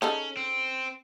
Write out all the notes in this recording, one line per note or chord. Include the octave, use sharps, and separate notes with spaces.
C#3 C#4 D#4 A4
C4